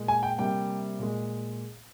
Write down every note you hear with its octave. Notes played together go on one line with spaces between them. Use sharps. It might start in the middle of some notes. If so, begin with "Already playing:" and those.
Already playing: A#2 G#3
G#5
G5
C3 G3 A#3 G5
A#2 G#3